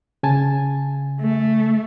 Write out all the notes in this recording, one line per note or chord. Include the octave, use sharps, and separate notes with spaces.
C#3 G#5 A5
A3